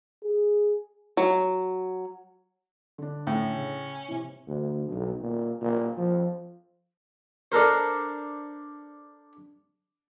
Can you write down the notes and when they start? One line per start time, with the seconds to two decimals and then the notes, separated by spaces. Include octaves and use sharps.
0.23 G#4
1.17 F#3
2.98 D3 D4
3.27 A2 C#4
3.55 C#3
4.08 C3 E3
4.47 D2
4.89 B1
5.21 A#2
5.61 A#2
5.97 F3
7.52 D4 A4 A#4 C5